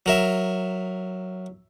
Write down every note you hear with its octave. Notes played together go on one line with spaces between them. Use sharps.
F#3 A#4 E5